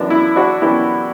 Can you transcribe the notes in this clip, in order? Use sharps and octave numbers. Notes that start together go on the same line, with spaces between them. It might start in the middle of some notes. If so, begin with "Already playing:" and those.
Already playing: F#2 E3 B3 D4
E4
D4 F#4
F#2 E3 B3 D4 E4 G4